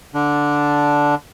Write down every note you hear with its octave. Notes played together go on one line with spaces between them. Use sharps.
D3 D4